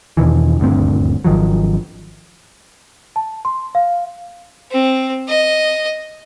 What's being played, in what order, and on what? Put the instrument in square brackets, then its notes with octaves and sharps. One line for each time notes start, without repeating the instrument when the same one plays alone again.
[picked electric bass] E2 B2 D#3 E3
D#1 D2 G2 C4
G#1 D#3 F3 F#3
[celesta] A5
C6
F5
[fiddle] C4
D#5